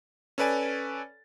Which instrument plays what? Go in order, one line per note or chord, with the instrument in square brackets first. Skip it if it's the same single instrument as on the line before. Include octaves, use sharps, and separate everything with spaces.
[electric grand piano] C#4 A4 B4 D5 G#5 A6